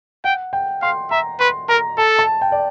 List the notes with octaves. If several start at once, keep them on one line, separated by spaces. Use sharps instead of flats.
F#5 G5
G5
F5 C6
E5 A#5
B4 C6
A#4 A#5
A4 A5
A5
G5
D5